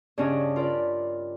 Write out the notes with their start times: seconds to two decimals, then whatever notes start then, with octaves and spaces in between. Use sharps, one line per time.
0.18 G2 C#3 C#4 D4 D#5
0.56 F4 A#4 D5 B5